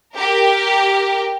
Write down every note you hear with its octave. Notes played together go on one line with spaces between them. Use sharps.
G4 A#4